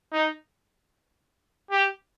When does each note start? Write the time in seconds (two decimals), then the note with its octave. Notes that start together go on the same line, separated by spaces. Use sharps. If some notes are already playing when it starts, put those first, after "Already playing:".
0.13 D#4
1.71 G4